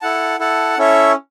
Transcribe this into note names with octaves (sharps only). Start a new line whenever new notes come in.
E4 A4 F#5 A5
E4 A4 F#5 A5
C#4 E4 A4 C#5 E5